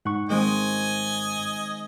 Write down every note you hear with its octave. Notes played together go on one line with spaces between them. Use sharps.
G#2 F#5 C#6
D#3 G#3 C4 D#5 G#5